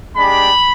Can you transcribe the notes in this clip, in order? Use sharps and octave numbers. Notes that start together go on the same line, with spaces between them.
G#3 D4 G4 B5